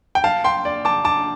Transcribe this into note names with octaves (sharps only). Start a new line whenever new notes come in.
G5
F5 A5
G5 C6
D5
A5 D6
A5 D6